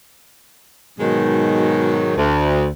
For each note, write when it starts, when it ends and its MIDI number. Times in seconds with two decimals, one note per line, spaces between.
0.99 2.12 44
0.99 2.12 47
0.99 2.12 51
0.99 2.12 54
0.99 2.12 56
2.16 2.67 38